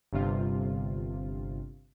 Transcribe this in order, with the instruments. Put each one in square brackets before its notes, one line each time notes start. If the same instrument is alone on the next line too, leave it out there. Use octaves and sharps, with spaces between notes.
[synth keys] G1 G2 C3 F4